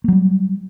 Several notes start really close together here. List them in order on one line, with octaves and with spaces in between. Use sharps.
A#3 F#3 G3